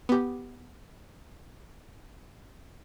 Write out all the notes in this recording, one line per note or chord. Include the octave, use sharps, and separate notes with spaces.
B3 G4